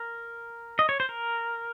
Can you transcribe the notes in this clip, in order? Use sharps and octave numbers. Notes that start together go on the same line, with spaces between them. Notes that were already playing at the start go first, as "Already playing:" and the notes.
Already playing: A#4
D#5
C#5
C5
A#4